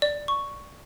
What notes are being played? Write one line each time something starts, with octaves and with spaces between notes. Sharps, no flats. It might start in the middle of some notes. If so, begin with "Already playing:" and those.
D5
C#6